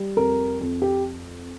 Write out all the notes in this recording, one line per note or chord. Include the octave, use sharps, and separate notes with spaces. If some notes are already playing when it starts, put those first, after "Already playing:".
Already playing: G3
F2 A#4
F2
G4